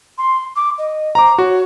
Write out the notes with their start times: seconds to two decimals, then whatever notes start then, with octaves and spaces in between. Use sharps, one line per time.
0.18 C6
0.56 D6
0.78 D#5
1.15 C5 A#5 D6
1.38 F#4 C#5